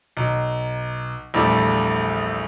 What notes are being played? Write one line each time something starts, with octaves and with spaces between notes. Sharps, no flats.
B1
A#1 E2 G3 A3 D5 D6